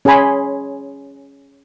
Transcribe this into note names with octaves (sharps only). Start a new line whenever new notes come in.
C#4 G#4 C#5 G#5 B5 C6